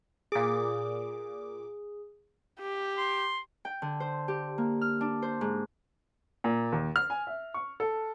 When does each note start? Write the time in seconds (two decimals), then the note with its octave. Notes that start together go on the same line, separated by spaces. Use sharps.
0.32 A#2 G#4 D6
2.60 G4
2.98 C6
3.65 G5
3.82 D3
4.00 C5
4.28 G4
4.58 A#3
4.81 F6
5.01 D4
5.22 C5
5.41 G#2
6.44 A#2
6.72 D#2
6.96 F6
7.10 G#5
7.27 E5
7.54 C#6
7.80 A4